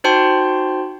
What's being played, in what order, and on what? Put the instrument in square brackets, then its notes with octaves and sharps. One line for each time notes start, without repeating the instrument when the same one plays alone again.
[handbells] D#4 F#4 C5 G5 A5 C6